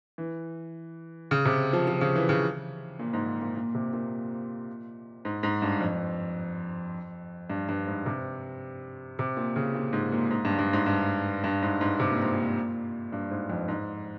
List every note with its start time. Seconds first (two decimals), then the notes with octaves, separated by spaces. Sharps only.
0.18 E3
1.31 C#3
1.45 C3
1.73 F3
1.87 F3
2.01 C#3
2.15 E3
2.29 C#3
2.99 A#2
3.13 G#2
3.42 A#2
3.56 A#2
3.75 C3
3.93 A#2
5.25 G#2
5.43 G#2
5.62 G2
5.81 F2
7.50 G2
7.69 G2
7.87 G#2
8.06 C3
9.19 C3
9.37 A#2
9.56 C#3
9.74 A#2
9.93 G#2
10.12 A#2
10.31 G#2
10.45 G2
10.59 G2
10.73 G#2
10.86 G2
11.44 G2
11.62 G#2
11.81 G#2
12.00 C3
12.11 A#2
12.22 G#2
12.34 A#2
13.12 G2
13.31 G#2
13.50 F2
13.68 G#2